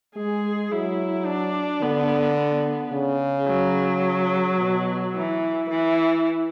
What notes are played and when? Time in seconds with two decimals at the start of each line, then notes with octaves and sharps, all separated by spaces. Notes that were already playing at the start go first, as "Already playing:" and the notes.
0.16 G#3 G#4
0.71 F#3 E4
1.26 D4
1.82 D3 B3
2.37 B3
2.92 C#3
3.48 F#3
4.59 B2
5.14 E3
5.70 E3